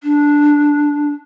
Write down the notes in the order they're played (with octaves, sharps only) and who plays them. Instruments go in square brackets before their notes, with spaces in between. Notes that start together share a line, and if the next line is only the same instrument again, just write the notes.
[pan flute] D4